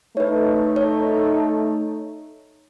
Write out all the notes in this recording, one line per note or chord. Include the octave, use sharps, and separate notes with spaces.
A3 D#4 B4 C#5
C#5